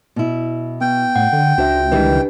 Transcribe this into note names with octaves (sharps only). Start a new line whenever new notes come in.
B2 E4
B3 G5
A2 F#5
D3
C#2 D4 F#4 C5 E5
D#3 E3 G3 D4 G4 B4